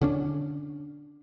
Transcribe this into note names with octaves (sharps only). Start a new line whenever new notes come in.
D3 C#4 D4